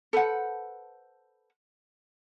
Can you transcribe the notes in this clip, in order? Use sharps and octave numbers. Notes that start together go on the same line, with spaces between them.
A4 B4 C5 F#5